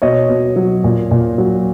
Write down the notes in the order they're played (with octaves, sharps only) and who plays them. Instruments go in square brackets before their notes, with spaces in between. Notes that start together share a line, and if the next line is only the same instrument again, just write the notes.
[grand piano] B2 C#5 D#5
B2
F#3
A#2
A#2
F#3